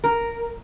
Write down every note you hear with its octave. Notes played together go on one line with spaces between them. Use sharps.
A#4